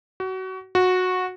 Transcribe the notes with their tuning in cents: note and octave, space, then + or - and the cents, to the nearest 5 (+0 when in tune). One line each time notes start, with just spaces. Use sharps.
F#4 +25
F#4 -15